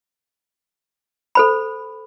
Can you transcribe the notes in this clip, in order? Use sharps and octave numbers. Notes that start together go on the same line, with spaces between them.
A4 C5 B5